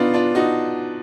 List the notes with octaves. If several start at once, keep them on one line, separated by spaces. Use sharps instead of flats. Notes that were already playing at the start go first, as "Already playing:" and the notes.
Already playing: B2 B3 D4 D#4 F4
D4 F4
D#4 F#4